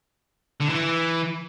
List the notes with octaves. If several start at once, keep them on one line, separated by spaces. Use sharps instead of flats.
D3
E3